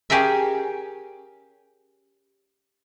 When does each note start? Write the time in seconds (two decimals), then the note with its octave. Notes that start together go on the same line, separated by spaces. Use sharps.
0.10 C#4 G4 G#4 A#4 E5